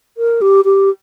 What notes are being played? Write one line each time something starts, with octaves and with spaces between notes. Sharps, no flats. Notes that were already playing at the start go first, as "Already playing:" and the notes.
A#4
G4
G4